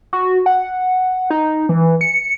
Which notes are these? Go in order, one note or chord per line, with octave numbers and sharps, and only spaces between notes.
F#4
F#5
D#4
E3
C#7